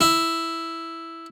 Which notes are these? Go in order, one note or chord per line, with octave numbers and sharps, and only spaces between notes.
E4